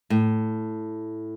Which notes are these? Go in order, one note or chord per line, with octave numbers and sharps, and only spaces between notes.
A2